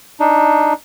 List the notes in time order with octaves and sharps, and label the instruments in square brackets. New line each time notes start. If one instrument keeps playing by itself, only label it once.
[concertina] D4 D#4